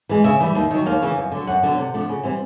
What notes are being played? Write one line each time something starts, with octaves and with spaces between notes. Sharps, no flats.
E3 G#3
C#3 E5
E3 G3
D#2
D#3 F#3
D#2 F5
C#3 E3
F#2
D3 F#3
F#2 F#5
D3 F#3 B3 D4
C3
F3 A3 D4
C#3
E3 G3 C4 E4